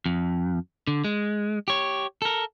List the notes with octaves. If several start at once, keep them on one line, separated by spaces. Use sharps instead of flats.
F2
D3
G#3
G4 C#5
A4 A#4